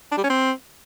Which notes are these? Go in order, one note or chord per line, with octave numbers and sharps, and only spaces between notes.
D4
G3
C#4
C4